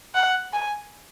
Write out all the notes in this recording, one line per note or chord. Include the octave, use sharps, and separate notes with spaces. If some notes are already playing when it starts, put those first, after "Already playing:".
F#5
G#5